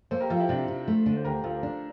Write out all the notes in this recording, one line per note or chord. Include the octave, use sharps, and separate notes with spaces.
A#3 A4 C5
G4 A#4
F3 F4 A4
E4 G4
C3 D4 F4
C3
A3
D3
C5
D2 G4 A#4
D2 F4 A4
D4